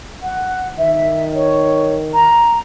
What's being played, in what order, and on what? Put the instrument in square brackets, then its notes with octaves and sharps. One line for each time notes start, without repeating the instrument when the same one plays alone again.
[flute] F#5
[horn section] D#3 [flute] E5
[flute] C#5
A#5